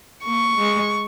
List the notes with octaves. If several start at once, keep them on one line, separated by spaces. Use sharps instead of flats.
A#3 C#6
G#3